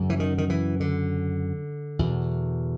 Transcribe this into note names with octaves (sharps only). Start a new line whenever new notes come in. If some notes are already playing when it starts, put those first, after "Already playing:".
Already playing: F#2 C#3
E3
D#3
D#3
E3
D3
E2 B2